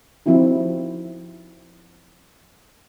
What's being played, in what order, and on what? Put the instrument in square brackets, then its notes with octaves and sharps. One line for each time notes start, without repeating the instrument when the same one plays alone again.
[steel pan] F3 C4 D#4 E4 F#4